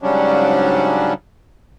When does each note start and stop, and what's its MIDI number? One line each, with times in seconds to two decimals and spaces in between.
0.02 1.13 44
0.02 1.13 49
0.02 1.13 54
0.02 1.13 55
0.02 1.13 61
0.02 1.13 62